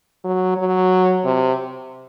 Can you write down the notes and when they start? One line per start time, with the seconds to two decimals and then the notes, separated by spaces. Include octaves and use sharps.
0.25 F#3
0.57 F#3
1.25 C3